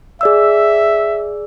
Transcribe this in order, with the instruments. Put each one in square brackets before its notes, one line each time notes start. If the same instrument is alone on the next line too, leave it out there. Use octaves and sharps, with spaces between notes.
[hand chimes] G#4 D5 E6 [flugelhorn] E5